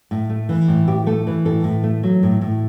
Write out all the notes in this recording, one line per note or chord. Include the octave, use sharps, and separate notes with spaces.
A2
A3
E3
A2
A2 G4
A3 A4
E3
A2 A4
A2
A3
F#3
A2
A2